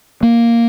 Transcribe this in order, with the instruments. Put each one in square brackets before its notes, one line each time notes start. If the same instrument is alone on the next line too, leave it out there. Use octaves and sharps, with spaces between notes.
[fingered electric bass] A#3